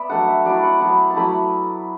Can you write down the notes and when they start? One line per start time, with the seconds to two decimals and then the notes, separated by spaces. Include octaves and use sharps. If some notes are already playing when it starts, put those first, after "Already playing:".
Already playing: B3 B4 D5 E5
0.09 F#3 A3 D4 F#5
0.27 E5
0.45 F#3 A3 E4 D5
0.63 F#5
0.80 F#3 B3 E4 A5
1.10 A5
1.16 F#3 A3 E4 B5